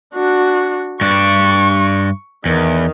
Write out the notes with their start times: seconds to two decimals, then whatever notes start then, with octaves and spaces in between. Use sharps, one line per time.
0.14 D4 F#4
1.01 G2 D4 C#6
2.45 E2 D#3